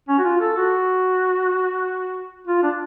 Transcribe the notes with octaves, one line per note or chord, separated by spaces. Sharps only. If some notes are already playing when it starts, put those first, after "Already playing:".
C#4
F#4
F4
A4
F#4
F4
D4